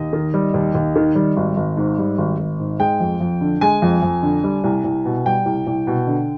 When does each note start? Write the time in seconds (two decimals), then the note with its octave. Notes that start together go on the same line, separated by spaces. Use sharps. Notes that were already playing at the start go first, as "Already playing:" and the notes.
Already playing: D#2 D#5
0.13 D#3
0.34 G3
0.54 D#2
0.75 D#2
0.96 D#3
1.15 G3
1.37 G#1
1.57 G#1
1.77 G#2
1.98 G3
2.18 G#1
2.39 G#1
2.59 G#2
2.80 G#3 G5
3.00 F2
3.20 F2
3.41 D3
3.61 G#3 G#5
3.82 F2
4.03 F2
4.23 D3
4.44 G3
4.64 C2
4.84 C2
5.05 B2
5.26 G3 G5
5.46 C2
5.67 C2
5.87 B2
6.07 D3